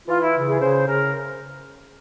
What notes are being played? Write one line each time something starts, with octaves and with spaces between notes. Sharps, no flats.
E3 F4
E4
C#3
G#4
C#3 C5
C#3 A#4